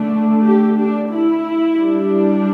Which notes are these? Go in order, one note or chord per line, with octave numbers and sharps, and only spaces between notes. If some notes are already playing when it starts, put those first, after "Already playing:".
Already playing: D3 A3 D4
G4
D4
E4
G3 D4